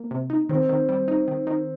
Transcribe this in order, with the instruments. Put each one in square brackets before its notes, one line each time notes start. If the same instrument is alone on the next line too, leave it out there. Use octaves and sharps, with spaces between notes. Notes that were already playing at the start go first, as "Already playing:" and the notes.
Already playing: [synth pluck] A#3
C3
D#4
[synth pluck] D#3 [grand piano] C4
[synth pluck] D#3
G3
D#4
D#3
D#3